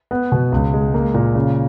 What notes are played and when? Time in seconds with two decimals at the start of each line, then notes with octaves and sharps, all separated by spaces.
0.11 B3
0.32 B2
0.52 C#2
0.74 G#3
0.94 A#3
1.14 A#2
1.35 C#3